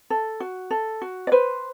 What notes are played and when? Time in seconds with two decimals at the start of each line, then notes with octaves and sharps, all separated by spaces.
0.10 A4
0.40 F#4
0.71 A4
1.02 F#4
1.27 D5
1.32 B4 C5